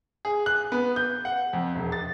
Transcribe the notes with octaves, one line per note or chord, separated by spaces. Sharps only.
G#4
F#6
B3
G6
F#5
F2
E1
A6